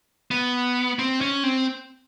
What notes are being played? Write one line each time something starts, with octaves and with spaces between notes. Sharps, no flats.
B3
C4
C#4
C4